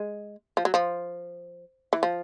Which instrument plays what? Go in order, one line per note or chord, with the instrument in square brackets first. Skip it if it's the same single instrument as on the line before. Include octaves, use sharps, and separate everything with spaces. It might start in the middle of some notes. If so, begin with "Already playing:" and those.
Already playing: [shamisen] G#3
F3
F#3
F3
E3
F3